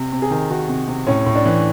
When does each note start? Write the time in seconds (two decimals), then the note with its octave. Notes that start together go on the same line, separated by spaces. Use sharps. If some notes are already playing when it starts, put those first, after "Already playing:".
Already playing: C3
0.12 C3
0.22 G#4
0.31 D#3
0.50 D#3 F#4
0.69 C3
0.88 C3
1.07 A2 C#4
1.26 A2
1.35 D4
1.46 E3